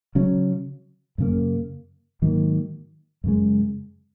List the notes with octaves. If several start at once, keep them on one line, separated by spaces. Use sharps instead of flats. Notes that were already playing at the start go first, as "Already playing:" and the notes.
C#3 F#3 C#4
F#2 C#3 A#3
G#2 D#3 F#3 A#3
F#2 C#3 G#3